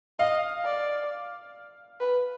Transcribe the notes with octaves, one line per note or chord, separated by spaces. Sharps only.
D#5 F5
D5
B4